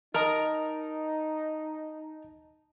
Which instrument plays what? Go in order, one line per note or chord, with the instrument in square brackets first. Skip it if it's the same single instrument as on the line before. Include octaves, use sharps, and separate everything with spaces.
[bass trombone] D#4 [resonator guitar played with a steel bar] A#4 A#5 [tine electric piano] D#5 A5